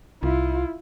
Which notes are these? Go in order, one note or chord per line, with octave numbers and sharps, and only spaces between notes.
C2 E4 F4